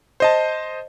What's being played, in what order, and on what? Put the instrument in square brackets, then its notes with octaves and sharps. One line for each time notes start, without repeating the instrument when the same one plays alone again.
[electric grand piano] C5 D#5 A5